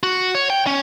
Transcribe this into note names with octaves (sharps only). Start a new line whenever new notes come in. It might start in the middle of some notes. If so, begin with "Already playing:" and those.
F#4
C#5
G5
C#4